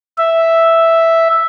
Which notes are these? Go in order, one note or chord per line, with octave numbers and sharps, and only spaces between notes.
E5